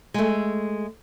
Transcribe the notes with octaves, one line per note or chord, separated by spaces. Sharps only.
G#3 A3